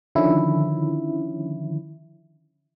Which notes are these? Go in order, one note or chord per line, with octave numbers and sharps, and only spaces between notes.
D3 D#3 F3 C#4 E4